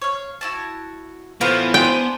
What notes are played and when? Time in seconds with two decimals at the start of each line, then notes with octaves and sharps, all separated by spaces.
0.02 C#5 F5
0.41 E4 F#4 A5
1.41 A2 E3 F3 B3 F4 G5 F6
1.74 D4 G#4 C5 G5